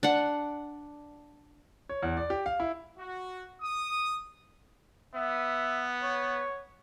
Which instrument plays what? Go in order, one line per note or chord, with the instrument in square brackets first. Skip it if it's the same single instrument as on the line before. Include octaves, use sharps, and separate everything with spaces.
[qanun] D4 F#5
[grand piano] C#5
E2
D5
G4
F5
E4
[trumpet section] F#4
D#6
[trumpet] B3 [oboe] E5
[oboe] C#5